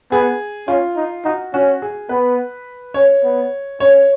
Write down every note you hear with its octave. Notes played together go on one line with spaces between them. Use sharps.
B3 G#4
C#4 F4
D#4
D#4 F#4
C#4 F#4
G#4
B3 B4
C#4 C#5
B3
C#4 C#5